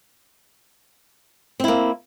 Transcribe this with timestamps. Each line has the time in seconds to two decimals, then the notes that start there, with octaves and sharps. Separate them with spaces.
1.60 C4
1.64 E4
1.68 A#3